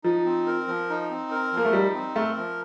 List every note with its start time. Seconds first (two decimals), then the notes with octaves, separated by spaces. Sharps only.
0.04 F3 D#4
0.25 C4
0.47 A#4
0.68 F3
0.90 D#4
1.10 C4
1.31 A#4
1.53 F3 A#3
1.65 A3
1.73 G3 D#4
1.94 C4
2.16 A3 A#4
2.37 F3